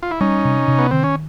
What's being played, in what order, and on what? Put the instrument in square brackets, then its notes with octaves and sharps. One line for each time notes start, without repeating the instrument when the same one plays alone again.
[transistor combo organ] F4
E4
[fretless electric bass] G3 [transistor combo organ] C#4 D#4
[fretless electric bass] C3
C3
[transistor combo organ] B3
[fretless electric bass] D#3 [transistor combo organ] C4
[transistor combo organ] C#4